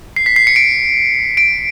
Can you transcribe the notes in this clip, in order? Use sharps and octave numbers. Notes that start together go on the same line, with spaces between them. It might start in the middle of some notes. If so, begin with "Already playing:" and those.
C7
B6
C7
C#7
D7
D7